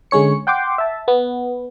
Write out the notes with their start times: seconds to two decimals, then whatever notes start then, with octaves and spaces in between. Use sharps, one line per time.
0.11 D3 G#3 C#4 C#5 C#7
0.47 F#5 G5 C6 D6
0.78 E5 A5
1.08 B3